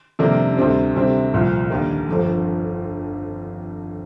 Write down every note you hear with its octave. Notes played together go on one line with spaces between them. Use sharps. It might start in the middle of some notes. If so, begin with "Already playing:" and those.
F2 C3 G3 A#3 D4
D2 C3 G3 C4
D2 C3 G3 C4
C2 A#2 F3
D#2 D3 G3 A#3
G1 F2 D3 F3